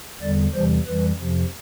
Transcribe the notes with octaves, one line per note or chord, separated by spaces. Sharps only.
E2 D3 G3 D5
E2 C3 E3 G3 C5
F2 E3 G3 B4
F2 C3 F3